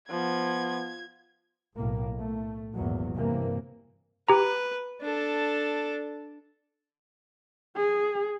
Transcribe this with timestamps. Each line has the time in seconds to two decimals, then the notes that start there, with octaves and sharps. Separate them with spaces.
0.10 F3 B3 G#6
1.77 B1 A2 A#3
2.14 A2 A3
2.75 G#1 E2 A#2 F#3
3.14 G2 C3 E3 A#3
4.29 G4 B4 A#5
5.01 D4 A4
7.77 G#4